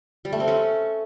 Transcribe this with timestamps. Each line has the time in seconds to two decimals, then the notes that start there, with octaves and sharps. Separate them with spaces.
0.25 G3
0.32 A3
0.40 C4
0.48 C#4